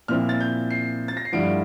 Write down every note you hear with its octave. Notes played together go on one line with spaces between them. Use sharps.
A#2 F3 C4 E4 F6
A6
G6
C7
A6
A#6
C7
G2 D3 F3 A3 E4 D7